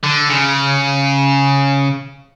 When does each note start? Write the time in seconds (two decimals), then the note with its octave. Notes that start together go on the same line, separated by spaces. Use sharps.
0.04 D3
0.29 C#3